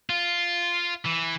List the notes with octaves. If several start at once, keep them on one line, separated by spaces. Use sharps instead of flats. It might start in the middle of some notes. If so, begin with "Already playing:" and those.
F4
E3